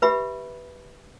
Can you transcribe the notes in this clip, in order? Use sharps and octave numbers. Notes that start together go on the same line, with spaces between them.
G4 B4 E5 B5